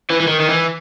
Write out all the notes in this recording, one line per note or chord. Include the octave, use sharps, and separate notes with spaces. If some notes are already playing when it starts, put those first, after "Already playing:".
E3
E3
D#3
D#3
E3